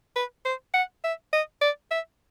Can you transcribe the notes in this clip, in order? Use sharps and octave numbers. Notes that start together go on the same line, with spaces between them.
B4
C5
F#5
E5
D#5
D5
E5